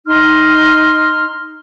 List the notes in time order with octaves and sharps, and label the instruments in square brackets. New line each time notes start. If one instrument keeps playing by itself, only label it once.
[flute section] D#4 C6 F6